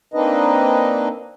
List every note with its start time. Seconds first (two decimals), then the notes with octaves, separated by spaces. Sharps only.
0.14 A#3 C4 D4 D#4 B4 D#5